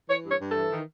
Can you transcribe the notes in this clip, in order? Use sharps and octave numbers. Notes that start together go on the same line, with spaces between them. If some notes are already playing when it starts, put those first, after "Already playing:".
E3 C#5
G2
C#5
G2
E3 A4
D#3